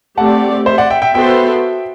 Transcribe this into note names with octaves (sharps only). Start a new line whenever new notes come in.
A3 C4 G4 D5 F#5 A5
C5 E5
D5 F#5
E5 G5
E5 G5
B3 F#4 A4 C5 E5 G5